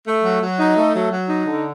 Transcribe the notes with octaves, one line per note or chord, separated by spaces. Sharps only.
A3
F#3
F#3
D#4
A3
F#3
F#3
D#4
D3